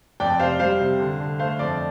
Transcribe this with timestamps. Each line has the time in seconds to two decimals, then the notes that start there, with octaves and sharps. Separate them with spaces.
0.20 F2 D5 G5
0.39 C3 C5 F5
0.60 G3 C5 F5
0.80 C3
1.00 D3
1.20 D3
1.39 A3 C5 F5
1.59 F2 D5